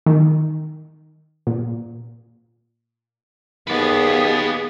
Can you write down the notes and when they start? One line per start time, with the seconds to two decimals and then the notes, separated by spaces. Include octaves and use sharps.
0.06 D#3
1.47 A#2
3.67 D#2 B3 G#4 B4 D5